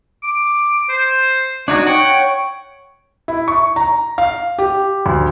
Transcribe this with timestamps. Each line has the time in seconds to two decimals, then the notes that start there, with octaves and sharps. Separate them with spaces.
0.24 D6
0.90 C5
1.68 D4 D#4 F#4 C#5
1.86 C#5 F#5 G5 C#6
3.28 E4
3.48 C#6
3.76 A#5
4.18 F5
4.59 G4
5.06 D2